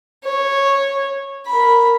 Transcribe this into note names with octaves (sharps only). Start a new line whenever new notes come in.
C#5
A#4 B5